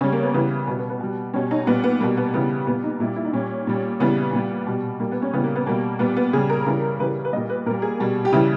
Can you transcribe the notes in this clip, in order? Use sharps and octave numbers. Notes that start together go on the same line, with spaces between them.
C#3 G3 C#4
A#3
B3
C#3 E3 G3 B3
B2 G3 B3
B3
B3
B2 G3
B2 G3 C#4
D#4
A#2 G3 B3
B3
B2 G3 A#3
B3
C#3 E3 G3 B3
A#2 G3 B3
D#4
A#2 G3 E4
E4
D#4
A#2 G3 C#4
A#2 G3
C#3 E3 G3 B3
A#2 G3
B2 G3
A#2 G3 A#3
B3
C#4
C#3 E3 G3 B3
A#3
B3
B2 G3 A#3
A#2 G3 B3
B3
C#3 G3 G#4
A#4
C#3 E3 G3
C#3 E3 G3 B4
A#4
B4
A#2 G3 D#5
B4
A#2 G3 A#4
G#4
B2 G3
G4
C#3 E3 G3 E4